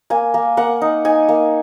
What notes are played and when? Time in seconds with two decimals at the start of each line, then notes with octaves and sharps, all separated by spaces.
0.10 A#3 G#5
0.34 A#3
0.57 A#3 F#5
0.81 D#4
1.05 D#4 G#5
1.29 A#3